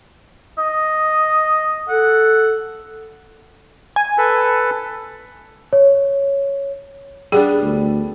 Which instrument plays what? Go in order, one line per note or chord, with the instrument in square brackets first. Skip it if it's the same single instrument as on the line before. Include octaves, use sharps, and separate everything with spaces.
[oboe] D#5
[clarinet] A4 [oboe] F#5
[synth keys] G#5
[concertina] A4 B4
[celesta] C#5
[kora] G3 B3 D4 [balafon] G#4
[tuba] D2